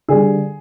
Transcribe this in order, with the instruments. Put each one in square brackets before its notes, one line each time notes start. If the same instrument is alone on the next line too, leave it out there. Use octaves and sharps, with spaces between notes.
[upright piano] D3 G3 G#4